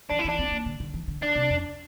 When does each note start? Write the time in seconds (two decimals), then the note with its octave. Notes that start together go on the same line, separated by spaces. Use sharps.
0.10 E3 D4
0.20 E4
0.25 E3 D4
0.39 C4
0.52 A#3
0.66 D3
0.80 D3
0.94 E3
1.08 D3
1.22 D4
1.35 C3
1.50 F2